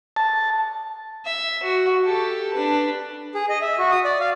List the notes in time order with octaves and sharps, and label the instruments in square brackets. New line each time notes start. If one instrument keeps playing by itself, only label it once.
[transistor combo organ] A5
[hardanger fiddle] E5
F#4
G4 A4
D4 B4
[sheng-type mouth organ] G#4
D#5
E5
F#4
D#6
D5
F5